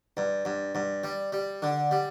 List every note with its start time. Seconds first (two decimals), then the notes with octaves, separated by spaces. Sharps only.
0.17 G2
0.45 G2
0.75 G2
1.04 G3
1.33 G3
1.62 D3
1.91 G3